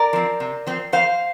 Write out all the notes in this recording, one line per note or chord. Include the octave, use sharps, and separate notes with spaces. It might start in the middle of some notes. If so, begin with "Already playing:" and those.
Already playing: A#4 D5
F3 C4
C3
F3 C4
F2 C5 F5